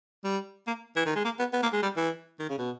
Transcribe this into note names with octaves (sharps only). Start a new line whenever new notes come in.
G3
A#3
E3
D#3
G#3
A#3
B3
B3
A#3
G#3
G3
E3
D#3
C#3
B2